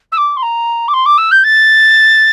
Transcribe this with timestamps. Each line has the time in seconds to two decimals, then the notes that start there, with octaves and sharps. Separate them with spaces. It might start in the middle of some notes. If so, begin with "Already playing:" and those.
0.12 E6
0.17 D6
0.36 C6
0.42 A#5
0.88 D6
0.93 C6
1.05 D6
1.17 E6
1.31 G6
1.44 A6